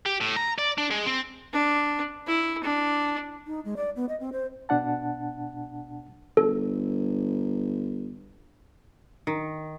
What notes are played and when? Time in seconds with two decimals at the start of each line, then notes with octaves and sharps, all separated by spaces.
0.06 G4
0.21 A2
0.36 A#5
0.58 D5
0.78 D4
0.91 G#3
1.06 C4
1.53 D4
2.27 E4
2.63 D4
3.47 D#4
3.65 G#3
3.77 D5
3.96 B3
4.09 D#5
4.20 C4
4.33 C5
4.69 B2 D4 F#5 A5
6.37 G1 A4
9.27 D#3